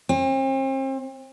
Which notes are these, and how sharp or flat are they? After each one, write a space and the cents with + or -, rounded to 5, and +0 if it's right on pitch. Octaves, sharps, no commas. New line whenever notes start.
C4 +40